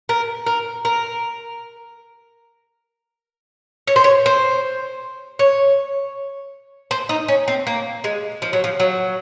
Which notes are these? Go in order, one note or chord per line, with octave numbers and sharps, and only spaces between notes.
A#4
A#4
A#4
C#5
C5
C#5
C5
C#5
C5
D#4
C#4
C4
A#3
G#3
F3
F#3
F3
F#3